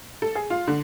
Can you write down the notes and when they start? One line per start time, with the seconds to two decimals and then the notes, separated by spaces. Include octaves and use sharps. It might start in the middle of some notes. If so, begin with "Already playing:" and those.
0.22 A4
0.35 G#4
0.50 F4
0.67 D3